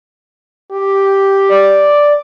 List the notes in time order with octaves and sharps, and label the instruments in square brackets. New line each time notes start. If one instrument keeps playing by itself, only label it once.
[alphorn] G4
[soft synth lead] D5